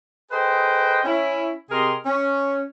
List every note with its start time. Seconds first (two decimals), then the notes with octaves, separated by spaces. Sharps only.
0.31 G#4 A4 B4 C5 D#5 G5
1.05 C#4 E4
1.70 C3 G4 G#4 A#4 D#5 C6
2.06 C#4